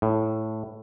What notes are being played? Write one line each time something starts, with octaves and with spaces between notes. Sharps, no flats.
A2